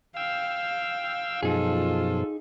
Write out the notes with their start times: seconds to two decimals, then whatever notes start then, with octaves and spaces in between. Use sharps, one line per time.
0.17 F5 G5 E6
1.43 F#2 B2 F3 D#4 F4 G#4 A4